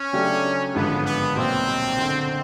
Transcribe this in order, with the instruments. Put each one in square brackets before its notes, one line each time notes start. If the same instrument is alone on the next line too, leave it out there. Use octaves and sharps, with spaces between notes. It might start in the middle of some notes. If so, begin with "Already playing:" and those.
Already playing: [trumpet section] C#4
[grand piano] C#3 F#3 A3 D4 G4
[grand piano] G#1 G2 D3 F3 G#3 [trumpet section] B3
[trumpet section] B3
[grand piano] B1 A#2 F#3 [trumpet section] C4
[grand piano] F#1 F#2 D3